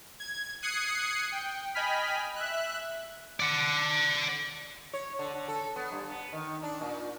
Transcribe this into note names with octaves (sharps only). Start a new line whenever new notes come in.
G#6
D#6 F#6 G#6 C7 C#7
G5
D#5 G5 G#5 B5 F6 B6
E5 F#6
D5 F#5
C#5
D3
D3
A4
B3
G2
B3
D#3
D4
A#2